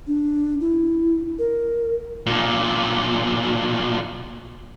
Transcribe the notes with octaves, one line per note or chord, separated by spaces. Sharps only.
D4
E4
A#4
B1 A#2